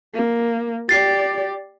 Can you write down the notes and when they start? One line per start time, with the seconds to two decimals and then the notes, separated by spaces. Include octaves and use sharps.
0.14 A#3
0.89 G4 D5 A6 C7